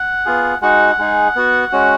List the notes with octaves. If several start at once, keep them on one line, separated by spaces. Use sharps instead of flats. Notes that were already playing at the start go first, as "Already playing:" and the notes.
Already playing: F#5
B3 F4 G#4
G#3 D#4 F#4 F#5
G#3 D#4 G#4
B3 F#4
G#3 C#4 F#4